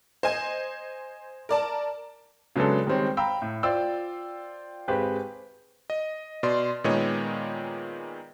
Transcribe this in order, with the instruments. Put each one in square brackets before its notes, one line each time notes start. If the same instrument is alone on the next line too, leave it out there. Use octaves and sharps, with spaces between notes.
[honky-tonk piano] C5 D#5 G#5
A#4 D5 A5
[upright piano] C#3 F#3 G#3 B3 D4 A4
D#3 G3 G#3 C4 C#5
F5 G5 A#5 B5 E6
A2
F4 C5 D5 G5 E6
G#1 C4 G4 G#4 B4
[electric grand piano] D#5
B2 D5 C6
A#2 D#3 G#3 B3 C#5 D#5